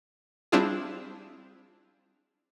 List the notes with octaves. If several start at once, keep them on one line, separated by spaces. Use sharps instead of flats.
G3 C4 D4 E4 F4 G#4